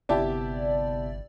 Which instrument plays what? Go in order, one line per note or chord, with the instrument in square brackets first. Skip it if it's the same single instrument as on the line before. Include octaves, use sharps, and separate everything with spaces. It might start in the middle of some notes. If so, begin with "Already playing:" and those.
[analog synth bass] G1 [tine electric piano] C3 B3 [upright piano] E4 G4 A5 [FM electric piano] D5